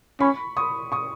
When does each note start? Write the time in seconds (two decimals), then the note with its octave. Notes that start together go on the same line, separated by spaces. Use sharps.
0.20 C#4 B5 C#6
0.57 C#6 D#6
0.92 C#6 D#6